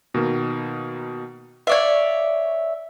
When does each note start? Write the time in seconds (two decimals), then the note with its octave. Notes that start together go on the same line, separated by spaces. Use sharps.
0.14 B2 D#3 A#3
1.67 C#5 D5 E5 F5 C#6